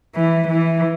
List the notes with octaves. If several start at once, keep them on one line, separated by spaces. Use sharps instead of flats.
E3
E3